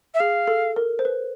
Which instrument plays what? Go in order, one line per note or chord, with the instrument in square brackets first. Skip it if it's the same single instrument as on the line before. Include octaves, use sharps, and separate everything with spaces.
[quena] E5
[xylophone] G#4 [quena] F5
[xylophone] A4
A#4
C5
B4